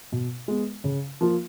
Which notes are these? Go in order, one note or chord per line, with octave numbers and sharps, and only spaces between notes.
B2
G#3 B3
C#3
F3 A#3 F4